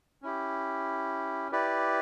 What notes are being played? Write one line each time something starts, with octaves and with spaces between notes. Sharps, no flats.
C#4 E4 G4
E4 G4 B4 D5